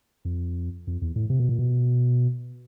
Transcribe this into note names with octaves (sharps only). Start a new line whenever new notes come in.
F2
F2
E2
A2
C3
B2
A#2
B2